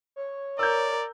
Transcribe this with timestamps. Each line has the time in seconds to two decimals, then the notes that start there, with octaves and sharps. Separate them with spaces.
0.16 C#5
0.59 A#4 D5 E6 G6